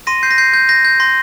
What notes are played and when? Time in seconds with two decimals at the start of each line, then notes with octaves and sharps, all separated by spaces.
0.07 C6 A#6 D#7
0.23 G6 C7
0.31 A#6
0.38 G6 C7
0.54 G6
0.69 G6 A#6
0.85 G6
1.00 C6 A#6